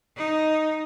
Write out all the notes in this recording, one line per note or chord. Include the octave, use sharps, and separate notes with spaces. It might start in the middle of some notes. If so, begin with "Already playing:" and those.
D#4